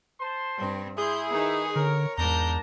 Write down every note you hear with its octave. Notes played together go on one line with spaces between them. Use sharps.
C5 A5 C6
G2 C4
E4 G#4 C6 G6
D#3 D#4 B4
D3 A#4 C#5
E2 G#2 D4 A#4 A5 A#5 G6